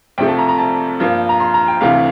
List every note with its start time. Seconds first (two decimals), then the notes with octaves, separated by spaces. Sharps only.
0.18 C2 C3 F3 A3 G5
0.28 A5
0.38 A#5
0.49 A#5
0.58 A5
1.00 G2 F3 A#3
1.29 A#5
1.40 C6
1.54 A#5
1.68 G5
1.81 D2 C3 E3 A3 F5